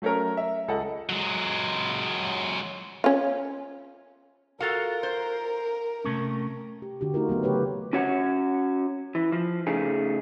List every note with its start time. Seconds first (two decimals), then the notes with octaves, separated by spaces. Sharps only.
0.02 F#3 A3 C#4 A4 A#4
0.37 E5
0.68 C#2 A4 D#5 F#5
1.09 F#3 G#3
3.04 C#4 F4
4.60 F4 F#4 A4 A#4 F5 F#5
5.03 C5
6.05 C3 A3 C#4
6.82 G4
7.01 D3 F#4 G4
7.14 A3 D#4 F4 F#4 A#4
7.28 D3 F#3 A3 B3
7.43 C#3 E3 A3 G4 B4 C#5
7.93 C#4 F#4 C#5 F#5
9.15 E3
9.32 F3
9.67 C#3 A3 D#4 G#4